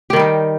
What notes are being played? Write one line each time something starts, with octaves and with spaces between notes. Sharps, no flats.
D#3 G3 D#4 G4